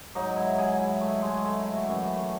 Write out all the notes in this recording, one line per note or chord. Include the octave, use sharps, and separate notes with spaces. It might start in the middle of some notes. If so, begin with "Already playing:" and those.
G#2 F#3 D#4
E4
G#4
E4
A3
G#3
A3
E4
F#4
F#2 E3